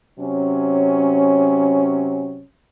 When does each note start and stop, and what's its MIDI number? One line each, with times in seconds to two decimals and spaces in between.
0.20 2.44 48
0.20 2.44 54
0.20 2.44 61